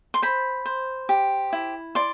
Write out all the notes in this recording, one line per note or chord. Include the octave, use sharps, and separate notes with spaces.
C6
C5 B5
C5
G4
E4
D5 C6